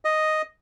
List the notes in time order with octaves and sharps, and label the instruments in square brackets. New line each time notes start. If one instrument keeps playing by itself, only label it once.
[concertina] D#5